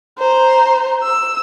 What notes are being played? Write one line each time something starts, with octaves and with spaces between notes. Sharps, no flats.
C5 A#5
E6